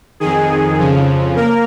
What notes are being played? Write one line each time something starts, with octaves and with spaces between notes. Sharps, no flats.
F2 D#3 G#4
F2 C#3 F3
A#3 A#4